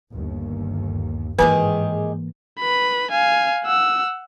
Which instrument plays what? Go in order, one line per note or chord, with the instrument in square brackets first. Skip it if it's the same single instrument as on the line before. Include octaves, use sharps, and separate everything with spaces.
[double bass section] G1 D#2
[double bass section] G#2 [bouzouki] D#3 G4 G#4 [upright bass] E3 A#3 [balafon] B4
[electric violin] B4 B5
F5 G#5
F#5 E6